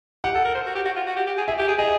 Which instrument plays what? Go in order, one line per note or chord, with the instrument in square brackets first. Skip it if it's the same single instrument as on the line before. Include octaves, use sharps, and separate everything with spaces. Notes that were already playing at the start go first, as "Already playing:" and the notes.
[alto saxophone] G4 [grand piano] F#5
[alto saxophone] A4
A#4
C5
F#4
G4
F#4
F4
F#4
G4
G4
G#4
[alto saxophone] G#4 [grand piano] E5
[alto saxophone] G4
G#4
[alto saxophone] G#4 [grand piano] D#5